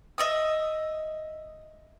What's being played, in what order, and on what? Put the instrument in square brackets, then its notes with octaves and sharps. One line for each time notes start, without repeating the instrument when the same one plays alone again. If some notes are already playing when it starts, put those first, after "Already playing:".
[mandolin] D#5 E5 D#6